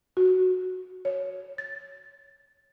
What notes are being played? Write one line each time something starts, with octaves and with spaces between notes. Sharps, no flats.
F#4
C#5
A6